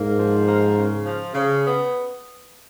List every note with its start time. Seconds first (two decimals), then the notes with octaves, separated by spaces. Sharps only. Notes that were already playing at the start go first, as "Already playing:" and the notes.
Already playing: G#2 A#3
0.17 F3
0.45 A#3
0.76 C#3
1.04 F3
1.34 C#3
1.64 B3